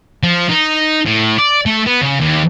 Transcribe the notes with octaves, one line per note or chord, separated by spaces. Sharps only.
F3
D#4
A2
D5
A3
B3
C#3
D#2